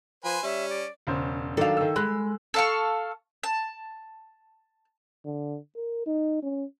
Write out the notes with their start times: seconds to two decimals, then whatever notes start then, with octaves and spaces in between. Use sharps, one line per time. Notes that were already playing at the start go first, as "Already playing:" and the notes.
0.24 F3 B4 C5 G#5
0.43 G3 C#4 E5
0.70 D5
1.07 E1 C#3 C5
1.57 D#3 F#3 D4 A4 F5
1.77 D#3 E6
1.96 G#3 B5 F#6
2.54 A4 F5 C#6
3.43 A5
5.26 D3
5.76 A#4
6.06 D#4
6.42 C#4